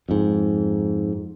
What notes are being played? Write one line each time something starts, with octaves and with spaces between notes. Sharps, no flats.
F2 G#2